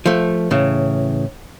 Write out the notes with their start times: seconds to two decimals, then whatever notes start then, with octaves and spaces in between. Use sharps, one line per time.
0.06 F3 A3
0.51 A2 C#3 E3